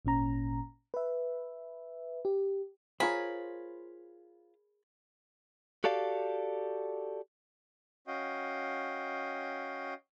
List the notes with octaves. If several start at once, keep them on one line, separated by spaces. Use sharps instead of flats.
G#1 A#2 C#4 A#5
B4 E5
G4
F4 G#4 A#4 C5 C#5 B5
F#4 G4 A4 D5 F5
C#4 F#4 D#5 F5 G5